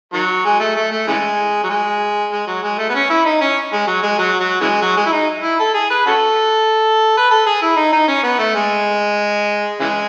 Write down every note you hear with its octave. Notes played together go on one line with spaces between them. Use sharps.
D#3 F#3
G#3
A3
A3
A3
C#3 E3 G#3
F#3
G#3
G#3
F#3
G#3
A3
B3
C#4
E4
D#4
C#4
G#3
F#3
G#3
F#3
F#3
C#3 E3 G#3
F#3
G#3
E4
D#4
E4
A4
G#4
B4
C#4 F#4 A4
B4
A4
G#4
E4
D#4
D#4
C#4
B3
A3
G#3
C#3 E3 G#3